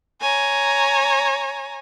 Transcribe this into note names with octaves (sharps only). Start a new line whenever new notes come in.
C#5 G#5 A#5